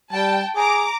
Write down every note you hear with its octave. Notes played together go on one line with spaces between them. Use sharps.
G3 G5 A5
G#4 A#5 D6